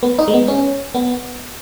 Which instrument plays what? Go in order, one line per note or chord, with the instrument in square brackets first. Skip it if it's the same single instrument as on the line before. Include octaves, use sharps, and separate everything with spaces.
[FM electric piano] B3
D#4
G#3
B3
C#4
B3